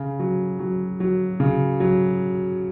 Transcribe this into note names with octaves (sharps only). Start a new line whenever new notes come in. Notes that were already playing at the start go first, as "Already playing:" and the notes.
Already playing: C#3
F#3
F#3
F#3
C#3
F#3